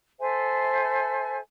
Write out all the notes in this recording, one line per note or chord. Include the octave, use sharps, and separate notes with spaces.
A4 C5 E5 G#5